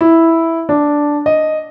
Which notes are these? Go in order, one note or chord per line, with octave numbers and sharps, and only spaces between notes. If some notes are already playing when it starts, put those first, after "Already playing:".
E4
D4
D#5